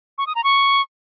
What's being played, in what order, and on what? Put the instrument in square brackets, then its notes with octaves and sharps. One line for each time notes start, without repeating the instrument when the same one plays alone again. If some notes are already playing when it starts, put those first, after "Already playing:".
[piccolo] C#6
D#6
A#5
C#6